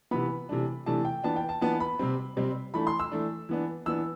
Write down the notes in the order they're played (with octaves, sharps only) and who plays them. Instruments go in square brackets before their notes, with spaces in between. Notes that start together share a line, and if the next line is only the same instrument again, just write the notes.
[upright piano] C3 E3 B3 B5
C3 E3 A3 D4
C3 E3 A3 D4 A5
G5
E3 B3 D4 A5
G5
A5
E3 B3 D4 A5
B5
C3 G3 C4
C3 G3 C4
E3 A3 D4 B5
C6
E6
E3 A3 D4
E3 B3 D4
E3 B3 D4 E6